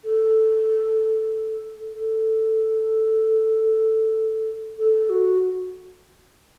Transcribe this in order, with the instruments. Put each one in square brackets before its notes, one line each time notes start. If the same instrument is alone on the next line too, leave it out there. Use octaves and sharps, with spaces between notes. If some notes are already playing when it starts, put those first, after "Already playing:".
[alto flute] A4
A4
A4
F#4